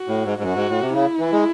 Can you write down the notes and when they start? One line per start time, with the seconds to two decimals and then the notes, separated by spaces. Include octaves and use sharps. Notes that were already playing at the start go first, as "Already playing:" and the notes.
Already playing: F#4
0.08 A2
0.25 G#2
0.38 G#2
0.43 F#2 F#4
0.56 G#2
0.69 A2
0.82 C3
0.94 C#3 E4
1.19 E3
1.33 G#3